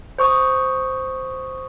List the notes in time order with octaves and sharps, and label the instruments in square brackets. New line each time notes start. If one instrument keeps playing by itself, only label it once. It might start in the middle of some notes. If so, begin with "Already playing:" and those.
[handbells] C5 C#6 D#6